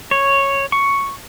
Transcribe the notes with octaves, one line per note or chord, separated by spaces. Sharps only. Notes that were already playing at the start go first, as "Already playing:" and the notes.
C#5
C#6